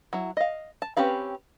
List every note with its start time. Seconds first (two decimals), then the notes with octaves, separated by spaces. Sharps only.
0.13 F#3 E4
0.37 D#5 F5
0.82 A5
0.97 C4 C#4 G4 B4 F5